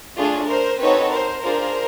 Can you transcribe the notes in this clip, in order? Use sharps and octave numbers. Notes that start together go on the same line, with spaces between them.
A3 D4 F4 G#4
A#4 C5
C4 D#4 F#4 A4 B4 C#5
A#4 C5
D4 F4 G#4 A#4 C5